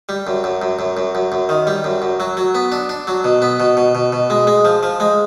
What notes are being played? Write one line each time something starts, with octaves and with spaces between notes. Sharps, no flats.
G3
F#2
F#2
F#2
F#2
F#2
F#2
F#2
D#3
G3
F#2
F#2
F#3
F#3
B3
D4
D4
F#3
B2
B3
B2
B2
B2
B2
G#3
G#3
F3
F3
G#3